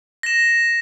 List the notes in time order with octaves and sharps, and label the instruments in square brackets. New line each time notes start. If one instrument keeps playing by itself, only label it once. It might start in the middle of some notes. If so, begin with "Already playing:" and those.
[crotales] A#6 E7